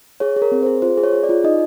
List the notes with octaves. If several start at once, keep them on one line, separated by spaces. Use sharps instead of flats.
G#4 C#5
G#4
A#4
C4
G#4 C5
F4 C5
G#4
C#5
G#4
D5
F4
D#4 D#5